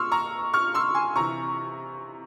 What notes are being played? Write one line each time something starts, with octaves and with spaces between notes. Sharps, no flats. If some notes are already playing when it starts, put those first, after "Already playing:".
Already playing: A#2 C6 C#6 E6 F6
A#5 C#6
C#6 F6
C6 E6
G#5 C6
C3 E3 A#5 C#6